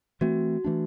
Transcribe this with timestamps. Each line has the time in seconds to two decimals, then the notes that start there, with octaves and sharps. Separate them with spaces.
0.21 E3 A3 C4 F#4
0.64 E3 A3 D4